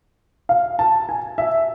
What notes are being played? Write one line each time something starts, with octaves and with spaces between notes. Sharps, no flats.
F5
A5
G#5
E5